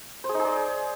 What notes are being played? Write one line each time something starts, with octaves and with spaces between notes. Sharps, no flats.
C5
G#4
D#4
G#4
D5